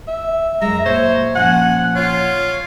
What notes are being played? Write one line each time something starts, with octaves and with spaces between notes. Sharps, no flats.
E5
F#2 G#3 E5 A#5
A#2 C5 C#5 E5
A#2 F3 C#4 F#5 G#5
F4 C#5